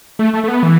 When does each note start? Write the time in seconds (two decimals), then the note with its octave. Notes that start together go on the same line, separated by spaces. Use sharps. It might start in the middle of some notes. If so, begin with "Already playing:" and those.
0.19 A3
0.33 A3
0.44 A3
0.48 B3
0.63 E3